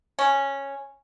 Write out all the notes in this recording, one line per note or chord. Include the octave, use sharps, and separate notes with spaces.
C#4